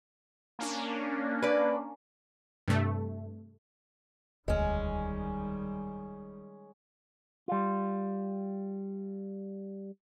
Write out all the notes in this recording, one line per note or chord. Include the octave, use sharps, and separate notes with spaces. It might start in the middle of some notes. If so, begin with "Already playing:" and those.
A#3 C#4 D4
B4 D5
G2 C3 A3
E1 D2 D#3 G3 G#3 C#4
G3 F4